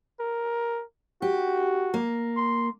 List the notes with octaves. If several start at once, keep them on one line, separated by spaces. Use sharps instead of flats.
A#4
F#4 G4
A#3
C6